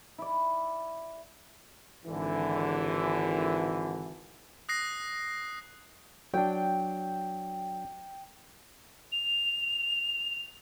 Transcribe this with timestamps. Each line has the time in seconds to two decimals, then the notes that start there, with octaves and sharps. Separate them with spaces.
0.18 E4 D5
2.06 G#1 D3 E3
4.69 D#6 F#6 A#6 C7
6.33 F#3 D4 G5
9.12 F7